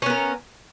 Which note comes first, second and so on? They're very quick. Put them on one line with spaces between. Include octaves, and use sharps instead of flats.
C#4 B3 A#4